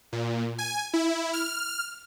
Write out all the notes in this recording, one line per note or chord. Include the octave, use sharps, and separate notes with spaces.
A#2
G#5
E4
F6